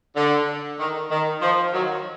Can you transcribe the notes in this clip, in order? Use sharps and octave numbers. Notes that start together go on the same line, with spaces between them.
D3
D#3
D#3
F3
D#3 F#3